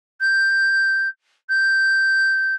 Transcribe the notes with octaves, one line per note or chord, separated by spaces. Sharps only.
G6
G6